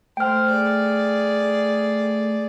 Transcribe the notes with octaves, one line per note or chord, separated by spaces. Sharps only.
A3 C5 G5 F6
G#4 D5